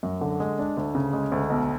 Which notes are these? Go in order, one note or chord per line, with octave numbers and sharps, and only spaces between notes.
F#2
D3
G#3
D4
D2
C#3
G#3
D2
B1